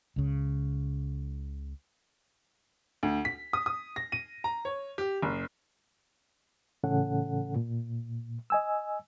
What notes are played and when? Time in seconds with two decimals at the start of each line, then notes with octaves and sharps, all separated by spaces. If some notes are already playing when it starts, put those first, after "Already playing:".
0.16 C#2 C#3
3.03 D2
3.25 B6
3.53 D#6
3.66 D#6
3.96 A#6
4.12 D#7
4.44 A#5
4.65 C#5
4.98 G4
5.23 F#1
6.84 A2 C#3 E3 C#4 A4 F#5
7.56 A#2
8.50 D#5 G#5 E6